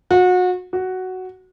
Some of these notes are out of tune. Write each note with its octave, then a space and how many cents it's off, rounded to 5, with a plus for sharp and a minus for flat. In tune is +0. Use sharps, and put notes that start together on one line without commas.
F#4 -30
F#4 +5